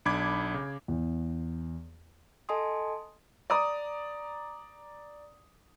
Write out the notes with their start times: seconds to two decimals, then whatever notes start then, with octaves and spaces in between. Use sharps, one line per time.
0.05 B1 D4 B5 D6 G#6
0.54 C#3
0.88 E2
2.49 A4 D#5 G#5 A5 C6 D#6
3.50 D5 A#5 D#6